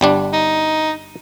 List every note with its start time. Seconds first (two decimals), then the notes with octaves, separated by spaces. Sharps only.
0.01 G1 G3 D4
0.33 D#4